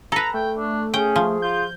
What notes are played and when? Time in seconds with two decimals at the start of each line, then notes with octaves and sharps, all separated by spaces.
0.12 A4 B4 A#5
0.34 A3 G5
0.58 D4
0.94 C#4 G#4 G5
1.16 F3
1.42 F4 G6